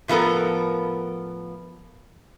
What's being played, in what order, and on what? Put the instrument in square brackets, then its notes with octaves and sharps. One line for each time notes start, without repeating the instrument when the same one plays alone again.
[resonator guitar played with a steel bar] A2 F3 B3 A4 A#4